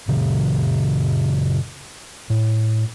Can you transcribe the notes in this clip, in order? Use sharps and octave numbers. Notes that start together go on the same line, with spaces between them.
F#2 A#2 C#3 F#3
A2